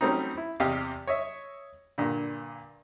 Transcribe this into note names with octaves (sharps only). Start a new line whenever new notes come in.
F#3 G3 A3 C4 C#4 D#4
E4
E2 C3 G4 D#5 F5
C#5 D#5 E5
G2 A#2 D3